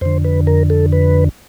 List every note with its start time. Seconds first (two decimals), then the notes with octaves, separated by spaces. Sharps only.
0.01 F2 D3 C5
0.25 B4
0.47 A#4
0.70 A4
0.92 B4